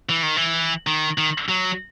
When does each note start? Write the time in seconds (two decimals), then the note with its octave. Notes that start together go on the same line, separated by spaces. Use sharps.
0.09 E3
0.23 D#3
0.37 E3
0.87 D#3
1.18 D#3
1.49 F#3